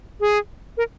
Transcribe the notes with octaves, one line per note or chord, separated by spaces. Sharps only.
G#4
A#4